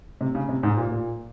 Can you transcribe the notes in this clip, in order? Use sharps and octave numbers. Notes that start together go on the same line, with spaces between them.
C3
C#3
C3
G#2
A#2
A#2